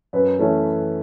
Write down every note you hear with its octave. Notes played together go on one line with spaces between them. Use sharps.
F#2 B4
E3 A3 C#4